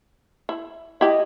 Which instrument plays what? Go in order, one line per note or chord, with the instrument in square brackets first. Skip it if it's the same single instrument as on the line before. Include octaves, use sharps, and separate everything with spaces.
[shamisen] E4
[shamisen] E4 G4 [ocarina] D#5